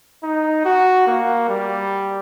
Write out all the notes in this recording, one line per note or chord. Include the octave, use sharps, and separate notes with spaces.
D#4
F#4
A#3
G3